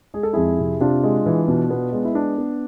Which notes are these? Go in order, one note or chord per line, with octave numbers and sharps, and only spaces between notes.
G#3 G#4
A4
F2 E4 G#4
C3
C3 D4 F4
G#3
E3
B2
B3
G#3
E4
B3 D4
B3